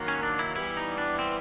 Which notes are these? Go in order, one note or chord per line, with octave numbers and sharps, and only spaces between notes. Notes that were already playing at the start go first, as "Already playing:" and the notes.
Already playing: D#3 F#3 A#3
C#4
D4
E4
E3 G3 B3 E4
D#4
D4
C4